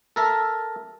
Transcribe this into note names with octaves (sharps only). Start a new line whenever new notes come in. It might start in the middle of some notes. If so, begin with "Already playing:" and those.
A4 A#4 E5 A5